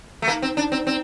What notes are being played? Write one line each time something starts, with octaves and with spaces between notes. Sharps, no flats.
A3
A#3 D#4
C4
D4
C4
C4